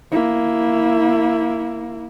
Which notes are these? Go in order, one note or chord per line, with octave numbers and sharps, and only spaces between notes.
A#3 E4